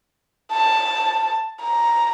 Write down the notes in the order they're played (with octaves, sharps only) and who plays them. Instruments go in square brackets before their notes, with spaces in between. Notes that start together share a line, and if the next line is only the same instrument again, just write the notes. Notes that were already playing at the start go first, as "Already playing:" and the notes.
[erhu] A5
A#5